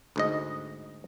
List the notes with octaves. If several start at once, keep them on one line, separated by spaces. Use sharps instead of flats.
D2 G#2 D#5